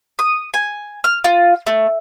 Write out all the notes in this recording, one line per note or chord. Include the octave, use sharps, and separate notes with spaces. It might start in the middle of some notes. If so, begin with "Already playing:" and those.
D#6
G#5
F6
F4
A3